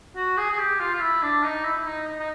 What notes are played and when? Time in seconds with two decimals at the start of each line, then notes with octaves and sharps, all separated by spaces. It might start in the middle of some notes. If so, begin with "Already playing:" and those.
0.16 F#4
0.38 G#4
0.51 G#4
0.58 G4
0.80 F4
0.94 F4
1.01 E4
1.22 D4
1.43 D#4
1.65 E4
1.77 E4
1.86 D#4
2.07 D#4
2.20 D#4